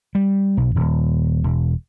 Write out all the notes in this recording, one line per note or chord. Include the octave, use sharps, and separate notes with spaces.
G3
B1
D#1
E1